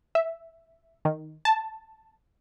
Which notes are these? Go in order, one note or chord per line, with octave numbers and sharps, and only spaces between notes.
E5
D#3
A5